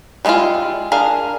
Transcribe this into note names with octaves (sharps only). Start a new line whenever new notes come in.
G3 G#3 C4 E4 F4
D4 G#4 A#4 F5